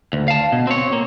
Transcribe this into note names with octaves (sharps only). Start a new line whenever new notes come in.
D2
F5 A5
B2
C4 C#5
A#3